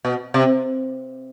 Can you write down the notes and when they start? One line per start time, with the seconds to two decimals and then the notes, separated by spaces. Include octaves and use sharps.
0.05 B2
0.34 C3